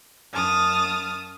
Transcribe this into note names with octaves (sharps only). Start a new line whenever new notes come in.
F#2 A5 D#6 F6